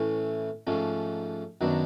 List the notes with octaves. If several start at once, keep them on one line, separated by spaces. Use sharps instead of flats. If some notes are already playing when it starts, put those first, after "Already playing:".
Already playing: A2 E3 A3 C#4
G#2 F3 A3 C#4
F#2 D#3 F#3 B3 D4